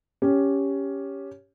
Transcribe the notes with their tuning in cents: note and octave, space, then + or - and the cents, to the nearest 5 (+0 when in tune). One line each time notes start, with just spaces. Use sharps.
C#4 +10 G4 +5